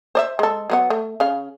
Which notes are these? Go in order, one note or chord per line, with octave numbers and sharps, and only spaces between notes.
C5 D5 E5
G#3 A4
F#3 B3 F#5
A3
C#3 F5